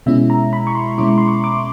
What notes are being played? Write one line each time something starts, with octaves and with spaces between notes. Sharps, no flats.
B2 G#3 C#4 E4 E5
A#5
B5
C#6
C6
B2 G#3 C#4 E4 D6
C#6
C6
C#6
D6